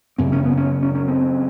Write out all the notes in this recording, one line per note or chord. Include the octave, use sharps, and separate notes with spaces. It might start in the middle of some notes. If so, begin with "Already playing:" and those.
F#2 C#3 C4
C#4
B3
C#4
C#4
C#4
C4